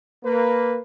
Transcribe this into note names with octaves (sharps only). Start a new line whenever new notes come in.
A#3 B4